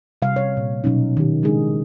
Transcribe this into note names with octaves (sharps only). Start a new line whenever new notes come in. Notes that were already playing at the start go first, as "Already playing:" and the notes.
C3 G3 F5
C#5
A#2
B2 F#3 C#4 D#4
D#3 G4
C#3 G#3 D4 D#4 G#4